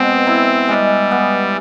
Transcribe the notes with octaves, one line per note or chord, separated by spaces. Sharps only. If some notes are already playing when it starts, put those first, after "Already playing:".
Already playing: B2 G#3 B3 C4
E4
G3 G#3
B3